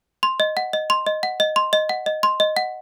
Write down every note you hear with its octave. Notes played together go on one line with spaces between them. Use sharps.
C6
D#5
F#5
D#5
C6
D#5
F#5
D#5
C6
D#5
F#5
D#5
C6
D#5
F#5